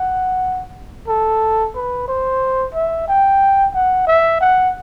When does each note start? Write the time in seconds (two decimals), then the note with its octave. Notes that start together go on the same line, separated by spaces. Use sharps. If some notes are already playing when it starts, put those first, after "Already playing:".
Already playing: F#5
1.08 A4
1.76 B4
2.08 C5
2.74 E5
3.08 G5
3.74 F#5
4.07 E5
4.41 F#5